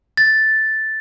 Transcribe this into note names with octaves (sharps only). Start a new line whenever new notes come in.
A6